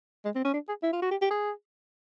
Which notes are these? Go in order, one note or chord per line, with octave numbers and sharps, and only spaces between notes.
G#3
C4
C#4
D4
G#4
E4
F4
F#4
G4
G4
G#4